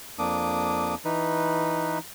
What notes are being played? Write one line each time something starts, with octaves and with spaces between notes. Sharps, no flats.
F2 A#3 D4 D6 D#6
E3 D#4 B4